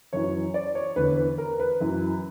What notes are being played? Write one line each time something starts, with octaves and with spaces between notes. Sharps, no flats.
F#2 E3 C#5
D5
C#5
E2 D3 B4
B4
A#4
B4
F#2 E3